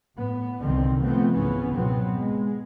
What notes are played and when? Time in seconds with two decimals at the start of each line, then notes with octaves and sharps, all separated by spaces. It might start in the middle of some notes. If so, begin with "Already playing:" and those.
0.15 A2 B3
0.63 C2 D3 D#3 C4
1.04 F3 A3 B3 C4
1.36 G#1 C#2 C#3 E3 B3 C#4
1.75 B2 F#3 B3 C4
2.20 G#3